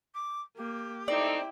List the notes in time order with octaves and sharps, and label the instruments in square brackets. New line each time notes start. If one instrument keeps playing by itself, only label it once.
[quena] D6
[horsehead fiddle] A#3 [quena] G4
[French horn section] A3 C4 D#4 [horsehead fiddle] E4 G5 [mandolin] D5